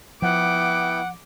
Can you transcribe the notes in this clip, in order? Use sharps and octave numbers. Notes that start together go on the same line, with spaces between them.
F3 B3 E4 F#5 G5 D6